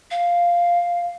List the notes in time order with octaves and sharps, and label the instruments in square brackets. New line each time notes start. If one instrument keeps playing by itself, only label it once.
[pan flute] F5